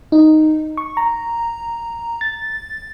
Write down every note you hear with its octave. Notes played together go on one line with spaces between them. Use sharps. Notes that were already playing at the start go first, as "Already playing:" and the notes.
D#4
C#6
A#5
A6